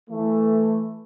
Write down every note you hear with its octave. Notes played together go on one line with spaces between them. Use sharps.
E3 A3